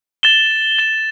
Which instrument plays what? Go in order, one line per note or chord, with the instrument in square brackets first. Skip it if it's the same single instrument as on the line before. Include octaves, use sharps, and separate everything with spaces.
[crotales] A6 E7 G7
A6 E7 G7